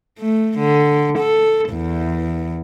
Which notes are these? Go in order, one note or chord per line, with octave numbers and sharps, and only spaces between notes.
A3
D3
A4
E2